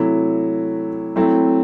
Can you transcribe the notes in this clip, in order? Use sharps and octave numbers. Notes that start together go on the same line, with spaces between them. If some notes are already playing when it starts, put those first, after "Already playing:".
Already playing: C3 F#3 A3 E4
F#3 A3 C4 E4